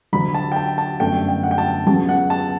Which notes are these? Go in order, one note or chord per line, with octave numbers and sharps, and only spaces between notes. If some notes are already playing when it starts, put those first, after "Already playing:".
D2 D3 F#3 B5
A5
G5
A5
A5
G1 F#2 D3 A3 G5
G5
F#5
G5
A5
C#2 C#3 F#3 B3 A5
F#5
A5